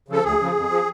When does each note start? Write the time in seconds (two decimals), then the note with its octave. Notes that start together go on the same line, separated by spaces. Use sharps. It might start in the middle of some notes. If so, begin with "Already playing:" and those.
0.08 C#3 F3 A4
0.24 D2 G#4
0.39 C#3 F3
0.55 F2
0.70 F3